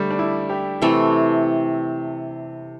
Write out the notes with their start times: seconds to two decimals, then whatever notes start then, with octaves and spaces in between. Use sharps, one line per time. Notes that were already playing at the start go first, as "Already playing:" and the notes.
Already playing: D3 G3 A3
0.10 D4
0.19 E4
0.50 G4
0.82 C3 E3 A3 A4